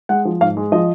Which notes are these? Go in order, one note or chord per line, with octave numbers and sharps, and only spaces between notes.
G#3 F#5
F3
G#2 F5
G#3
F3 D#5